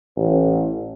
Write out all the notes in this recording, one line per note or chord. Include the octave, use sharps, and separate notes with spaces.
A1